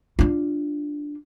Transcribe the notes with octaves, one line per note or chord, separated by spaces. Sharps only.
D4 F4